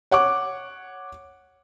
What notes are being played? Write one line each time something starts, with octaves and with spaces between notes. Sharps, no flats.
C#5 F#5 C#6 D6